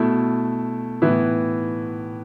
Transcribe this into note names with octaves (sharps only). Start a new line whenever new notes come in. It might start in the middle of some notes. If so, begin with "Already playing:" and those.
Already playing: B2 A3 E4
A2 E3 B3 E4